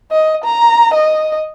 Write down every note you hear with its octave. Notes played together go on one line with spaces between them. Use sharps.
D#5
A#5
D#5